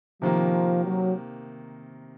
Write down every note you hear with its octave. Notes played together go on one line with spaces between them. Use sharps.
C3 D#3 F3 A#3
F#3